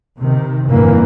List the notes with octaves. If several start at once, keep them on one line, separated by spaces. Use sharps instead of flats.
C3 D#3
G1 F2 A#2 D3 E3 A#3